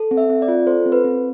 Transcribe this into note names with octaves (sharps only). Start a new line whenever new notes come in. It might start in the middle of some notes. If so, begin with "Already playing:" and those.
Already playing: A4
C4
E5
C4
D5
F4
A4 C5
C4
B4
C4